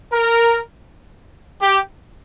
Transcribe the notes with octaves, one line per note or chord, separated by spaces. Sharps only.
A#4
G4